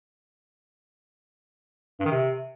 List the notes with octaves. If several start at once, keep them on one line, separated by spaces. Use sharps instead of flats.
G2
D#3
C3